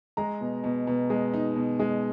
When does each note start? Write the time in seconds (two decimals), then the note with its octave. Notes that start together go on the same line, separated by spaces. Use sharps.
0.17 G#3 A#5
0.41 B2
0.64 B2
0.87 B2
1.10 G#3
1.34 D#4
1.56 B2
1.80 G#3